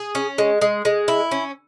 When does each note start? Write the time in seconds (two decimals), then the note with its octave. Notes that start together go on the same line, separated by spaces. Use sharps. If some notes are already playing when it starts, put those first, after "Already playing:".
Already playing: G#4
0.15 C#4
0.38 G#3
0.61 G#3
0.85 G#3
1.08 E4
1.31 C#4